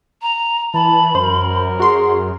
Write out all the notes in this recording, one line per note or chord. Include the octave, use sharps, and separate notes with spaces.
A#5
E3 A5 B5
F#2 A#4 C5
F#4 G#4 C6